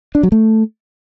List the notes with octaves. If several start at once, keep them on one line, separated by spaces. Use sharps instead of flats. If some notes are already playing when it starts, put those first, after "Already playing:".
D4
F#3
A3